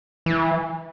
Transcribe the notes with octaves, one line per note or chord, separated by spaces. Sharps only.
E3